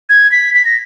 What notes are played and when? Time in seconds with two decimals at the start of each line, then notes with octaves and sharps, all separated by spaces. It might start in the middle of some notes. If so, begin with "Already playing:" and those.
0.09 G#6
0.32 B6
0.54 B6
0.65 A#6